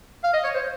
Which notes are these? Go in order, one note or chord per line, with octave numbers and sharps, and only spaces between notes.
F5
D#5
C#5
C5